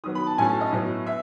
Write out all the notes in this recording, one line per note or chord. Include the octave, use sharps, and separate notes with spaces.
D#3 F#3 B3 D#6
B5
A5
A2 F#3 A3 C#4 G#5
A5
D#5
A2 F#3 B3
E5